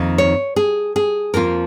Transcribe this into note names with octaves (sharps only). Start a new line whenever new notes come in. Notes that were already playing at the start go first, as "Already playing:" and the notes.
Already playing: F2 D#3 A#3 D#4
C#5
G#4
G#4
F2 F3 A#3 F4 A#4